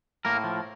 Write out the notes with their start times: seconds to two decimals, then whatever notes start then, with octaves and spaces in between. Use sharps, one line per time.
0.25 A2 A#3 A#4
0.44 F3